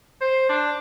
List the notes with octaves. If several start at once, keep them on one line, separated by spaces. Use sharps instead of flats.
C5
D4